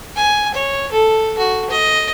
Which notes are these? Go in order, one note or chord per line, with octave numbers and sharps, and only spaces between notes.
G#5
C#5
A4
F#4
D#5